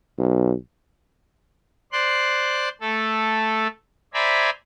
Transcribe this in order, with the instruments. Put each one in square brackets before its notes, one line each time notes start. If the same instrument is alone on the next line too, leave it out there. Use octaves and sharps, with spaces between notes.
[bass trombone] B1
[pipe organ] C5 D5 C6 F#6
A3 A4
C5 D5 E5 G#5 A#5 B5